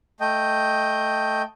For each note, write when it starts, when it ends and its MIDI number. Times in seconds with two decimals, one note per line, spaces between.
0.21 1.42 57
0.21 1.42 75
0.21 1.42 79